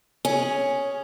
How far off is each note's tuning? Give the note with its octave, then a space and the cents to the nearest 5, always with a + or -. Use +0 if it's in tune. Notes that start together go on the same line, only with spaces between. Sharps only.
C#4 +0 G#4 +0